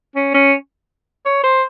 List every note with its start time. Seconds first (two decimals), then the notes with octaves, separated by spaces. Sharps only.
0.16 C#4
0.34 C#4
1.25 C#5
1.43 C5